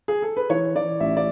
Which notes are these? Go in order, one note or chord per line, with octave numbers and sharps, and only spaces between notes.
G#4
A4
B4
E3 C#5
E3 D5
A1 E5
D5